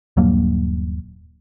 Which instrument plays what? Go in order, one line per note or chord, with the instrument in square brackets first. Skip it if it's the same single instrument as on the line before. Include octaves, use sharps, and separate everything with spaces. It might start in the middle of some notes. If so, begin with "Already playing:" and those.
[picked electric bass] D#1 G2 F#3 A#3